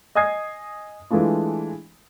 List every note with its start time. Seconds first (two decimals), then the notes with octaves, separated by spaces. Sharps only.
0.15 D#5 G#5 D#6 G#6 C7
1.10 E3 G#3 A3 D4 F4